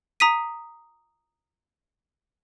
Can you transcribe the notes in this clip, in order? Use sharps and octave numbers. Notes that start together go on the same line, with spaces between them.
A#5 D#6 B6 D#7